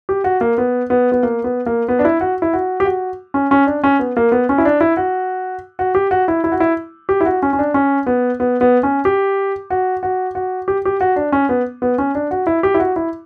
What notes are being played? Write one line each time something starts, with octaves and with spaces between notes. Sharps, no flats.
G4
F#4
A#3
B3
B3
B3
A#3
B3
A#3
B3
D4
E4
F#4
E4
F#4
G4
F#4
C#4
C#4
D4
C#4
B3
A#3
B3
C#4
E4
D4
E4
F#4
F#4
G4
F#4
E4
E4
F#4
E4
G4
E4
F#4
C#4
C#4
D4
C#4
B3
B3
B3
C#4
G4
F#4
F#4
F#4
G4
G4
F#4
D4
C#4
B3
B3
C#4
D4
F#4
E4
G4
E4
F#4
E4